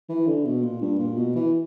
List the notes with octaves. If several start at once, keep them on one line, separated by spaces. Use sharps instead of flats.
E3
D3
B2
A#2
G2
A#2
B2
E3